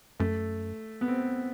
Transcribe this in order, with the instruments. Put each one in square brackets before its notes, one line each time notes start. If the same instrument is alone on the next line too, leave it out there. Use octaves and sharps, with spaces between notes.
[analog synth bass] F#2 [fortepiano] A3
[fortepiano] B3
C4